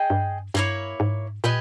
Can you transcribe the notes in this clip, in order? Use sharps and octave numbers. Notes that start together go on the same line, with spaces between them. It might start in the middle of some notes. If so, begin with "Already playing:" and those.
Already playing: G#4 D#5 G5
G2
G2 A#3 E4 A#4 C#5
G#2
A#2 G4 B4 D#5 G#5